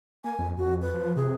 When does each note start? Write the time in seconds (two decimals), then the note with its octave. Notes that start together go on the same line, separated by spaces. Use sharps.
0.24 A#3 G#5
0.39 F2
0.58 F2 F#4
0.82 B4
0.94 F3
1.16 C3 G#4